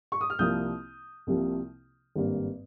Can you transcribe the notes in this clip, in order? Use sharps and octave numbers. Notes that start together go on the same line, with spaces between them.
C#6
D#6
F6
C2 C3 F3 A#3 D#6 G6
C2 C3 F3 A#3
G#1 G2 G3 A#3